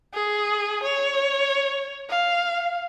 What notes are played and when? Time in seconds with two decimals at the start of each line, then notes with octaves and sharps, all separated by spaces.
0.13 G#4
0.83 C#5
2.09 F5